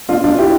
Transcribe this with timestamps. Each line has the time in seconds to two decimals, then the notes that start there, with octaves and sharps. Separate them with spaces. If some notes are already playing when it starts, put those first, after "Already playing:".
0.09 D4 F4
0.24 D4 F4
0.38 E4 G4